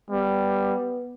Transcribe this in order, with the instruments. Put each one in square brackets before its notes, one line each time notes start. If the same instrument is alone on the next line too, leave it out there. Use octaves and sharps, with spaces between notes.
[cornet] G3 [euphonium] B3